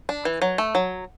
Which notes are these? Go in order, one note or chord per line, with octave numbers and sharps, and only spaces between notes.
D4
E3
F#3
A3
F#3